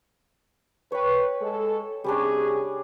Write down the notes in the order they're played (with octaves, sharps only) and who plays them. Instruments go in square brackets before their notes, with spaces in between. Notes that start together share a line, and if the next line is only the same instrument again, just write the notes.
[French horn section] B4 [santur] C#5 G5
[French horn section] G#3 A4
[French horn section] C3 G#4 [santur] G3 C#4 D4